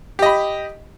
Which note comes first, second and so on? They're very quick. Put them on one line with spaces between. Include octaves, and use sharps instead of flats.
G4 D#5 B5